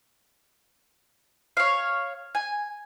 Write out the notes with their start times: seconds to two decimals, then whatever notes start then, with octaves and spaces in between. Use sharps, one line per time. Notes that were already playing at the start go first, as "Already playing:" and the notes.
1.57 C#5 F5
2.35 G#5